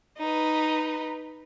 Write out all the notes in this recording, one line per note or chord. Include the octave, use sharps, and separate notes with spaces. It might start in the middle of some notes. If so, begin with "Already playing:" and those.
D#4 B4